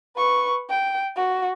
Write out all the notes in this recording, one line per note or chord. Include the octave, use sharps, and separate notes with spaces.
B4 C#6
G5
F#4